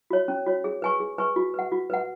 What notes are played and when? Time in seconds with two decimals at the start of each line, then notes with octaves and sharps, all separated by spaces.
0.10 F#4 C#5
0.28 C#4
0.46 F#4 C#5
0.64 G#4
0.82 B4 G#5 C#6
1.00 G#4
1.18 B4 G#5 C#6
1.36 F#4
1.54 B4 F#5
1.72 F#4
1.90 B4 F#5